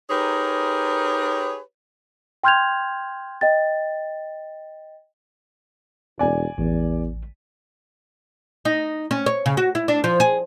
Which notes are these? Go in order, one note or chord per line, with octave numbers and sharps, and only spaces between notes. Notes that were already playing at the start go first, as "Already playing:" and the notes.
D#4 G4 G#4 A#4 B4 C#5
G5 C6 F6 G6 G#6 F7
D#5 G5 A6
E1 D5 G#5
A1 E2
D#4
C#4
C#5
C#3
F#4
E4
D4
F3
G#4